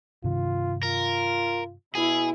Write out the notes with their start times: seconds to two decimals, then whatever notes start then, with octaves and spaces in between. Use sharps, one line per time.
0.24 G2 C3 D#3 F4
0.83 F4 A#4
1.95 B2 E4 G#4